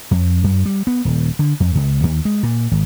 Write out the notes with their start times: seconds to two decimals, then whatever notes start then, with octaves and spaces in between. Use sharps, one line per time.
0.11 F2
0.44 F#2
0.66 G3
0.87 B3
1.05 D#1
1.39 D3
1.60 F2
1.75 C#2
2.03 D#2
2.25 G#3
2.43 A#2
2.71 G#1